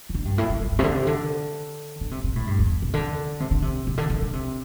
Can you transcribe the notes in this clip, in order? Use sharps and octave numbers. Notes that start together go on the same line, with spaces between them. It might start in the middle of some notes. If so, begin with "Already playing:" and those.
E3
D3
G2
A2
C3
G2
G2
C3
D3
C3
D3
D3
C3
C3
A2
G2
E2
C3
D3
C3
D3
C3
C3
D3
D3
D3
C3